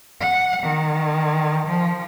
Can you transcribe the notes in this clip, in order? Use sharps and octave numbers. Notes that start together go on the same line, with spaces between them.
F#5
D#3
F3